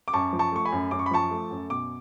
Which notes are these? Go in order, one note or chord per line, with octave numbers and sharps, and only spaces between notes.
D6
F#2 A5 C#6
F3
A5 C#6
A3 C#6
G#5 B5
F#2
F#2 D6
C#6
B5
F3 A5 C#6
A3
F#2
B2 D6